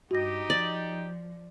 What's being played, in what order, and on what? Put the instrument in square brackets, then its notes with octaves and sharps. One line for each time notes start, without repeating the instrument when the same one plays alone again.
[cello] G2 D#5 [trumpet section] D#4 G4 [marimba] F#4 A#6
[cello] F3 [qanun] D5